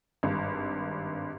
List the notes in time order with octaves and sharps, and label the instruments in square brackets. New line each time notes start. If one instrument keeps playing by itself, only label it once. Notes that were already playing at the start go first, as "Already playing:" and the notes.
[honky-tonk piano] G#1 G2